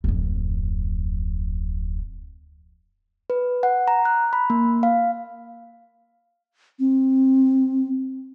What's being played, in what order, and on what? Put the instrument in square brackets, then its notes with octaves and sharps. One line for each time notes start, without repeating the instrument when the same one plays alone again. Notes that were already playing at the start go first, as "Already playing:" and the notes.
[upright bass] D1 F2
[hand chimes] B4
F#5
A#5
F#6
B5
A#3
F5
[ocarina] C4